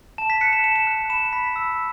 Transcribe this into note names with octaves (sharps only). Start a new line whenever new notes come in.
A5 E7
B6
F#6 C#7
E7
A5 E7
E7
F#6
B5 E7
B5 B6
E6